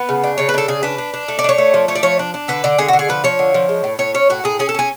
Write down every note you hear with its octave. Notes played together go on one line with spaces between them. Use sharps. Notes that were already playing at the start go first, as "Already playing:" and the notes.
Already playing: B3 B4
C#3
D4
C#3 C#5
B4
D4 A4
C#3 G#4
D4 B4
D4
D4
A3
D5
D4 C#5
A3
F3
A3 C#5
D5
F3 C#5
D4
D4
D3 B4
D3 D5
D3 G#4
F#4
D3
G#4
F3 B4
F3 C#5
D3
F3
G#3
A2
A2 C#5
C#4 C#5
A2 F#4
A2 G#4
C#4 G#4
A4
C#4 G#4